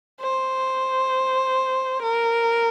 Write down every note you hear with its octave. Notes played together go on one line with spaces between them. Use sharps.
C5
A#4